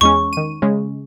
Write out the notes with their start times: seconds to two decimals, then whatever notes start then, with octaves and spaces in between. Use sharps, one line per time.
0.01 E2 G#3 C#4 C#6
0.33 D#3 D#7
0.62 C#3 G#3 C#4